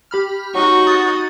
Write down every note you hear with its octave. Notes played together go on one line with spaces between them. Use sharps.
G4 B5 F6
F#3 D#4 F#4 C#6
D#6 A6